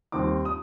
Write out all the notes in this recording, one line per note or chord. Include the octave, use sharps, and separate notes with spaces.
D#2 D#3 G3 C4 D#4 D6
D#6